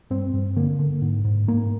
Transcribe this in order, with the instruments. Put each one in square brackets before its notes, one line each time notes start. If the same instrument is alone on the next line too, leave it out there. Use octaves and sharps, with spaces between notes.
[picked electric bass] G2 C4
G2
D3 A#3
D3
G#2
G#2
G#2 A#3